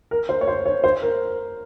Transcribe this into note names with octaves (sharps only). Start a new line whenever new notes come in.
A#4
C5
C#5
C5
C#5
C5
A#4